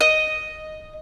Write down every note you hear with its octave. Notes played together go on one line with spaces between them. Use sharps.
D#5